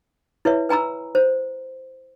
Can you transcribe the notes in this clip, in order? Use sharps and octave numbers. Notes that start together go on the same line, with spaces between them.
E4 B4 C#5 E5
B4 G#5 A#5 B5 E6
C5